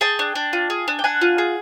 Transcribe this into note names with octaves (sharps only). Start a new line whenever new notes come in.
G#4 G5 A5
D4
D4
F4
G#4
D4
G5
D4 F#5 G#5
F4
G#4